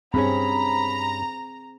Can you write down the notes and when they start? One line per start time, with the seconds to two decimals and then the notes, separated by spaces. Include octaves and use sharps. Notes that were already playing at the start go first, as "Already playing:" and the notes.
0.14 G2 C4 C#4 G#4 A#5 B5